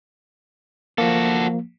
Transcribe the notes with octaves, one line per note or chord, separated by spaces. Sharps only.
F3 A#3 F#4 A4